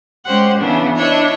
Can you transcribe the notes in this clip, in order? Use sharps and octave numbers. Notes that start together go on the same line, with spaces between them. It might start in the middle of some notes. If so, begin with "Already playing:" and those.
G#3 C#4 G4 C5 F#5
C#3 E3 B3 C#4 D4
D4 E4 C#5 D#5